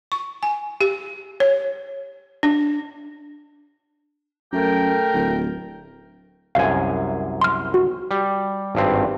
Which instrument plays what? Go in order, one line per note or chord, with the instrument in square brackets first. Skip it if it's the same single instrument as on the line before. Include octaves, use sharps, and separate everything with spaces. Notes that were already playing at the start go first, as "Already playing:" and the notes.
[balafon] C#6
G#5
G4
C#5
D4
[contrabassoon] F#2 [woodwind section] A3 A#4 G5
[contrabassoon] D1
[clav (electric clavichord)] C2 F#2 G#5 [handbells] F5
[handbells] C6 F6
F#4
[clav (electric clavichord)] G3
G#1 G2 C4